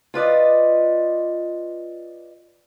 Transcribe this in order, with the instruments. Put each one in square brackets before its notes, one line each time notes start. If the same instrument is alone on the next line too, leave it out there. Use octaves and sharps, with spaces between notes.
[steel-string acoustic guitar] F4 B4 D5 D#5